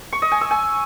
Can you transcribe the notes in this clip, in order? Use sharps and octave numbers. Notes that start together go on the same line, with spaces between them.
C#6
D#5
G#5
E6
G#5